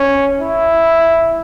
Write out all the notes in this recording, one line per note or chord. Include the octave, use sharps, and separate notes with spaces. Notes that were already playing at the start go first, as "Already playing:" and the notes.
Already playing: C#4
E4